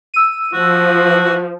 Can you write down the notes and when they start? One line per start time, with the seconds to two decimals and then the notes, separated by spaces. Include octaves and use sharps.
0.14 E6 D#7
0.53 F3 F#4